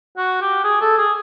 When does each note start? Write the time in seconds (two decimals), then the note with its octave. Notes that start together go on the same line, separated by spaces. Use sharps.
0.17 F#4
0.41 G4
0.64 G#4
0.81 A4
0.98 G#4